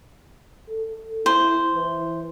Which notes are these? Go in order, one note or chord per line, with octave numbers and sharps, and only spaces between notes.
A4
E4 C5
E3